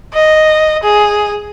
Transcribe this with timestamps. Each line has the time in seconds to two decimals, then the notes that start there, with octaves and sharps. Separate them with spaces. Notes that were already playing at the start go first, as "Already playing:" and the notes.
0.14 D#5
0.83 G#4